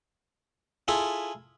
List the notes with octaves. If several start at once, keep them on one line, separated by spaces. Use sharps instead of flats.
E4 F4 G#4 A4